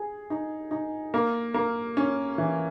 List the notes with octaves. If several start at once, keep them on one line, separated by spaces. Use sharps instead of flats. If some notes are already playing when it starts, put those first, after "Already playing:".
Already playing: G#4
D#4
D#4
A#3
A#3
C#4
E3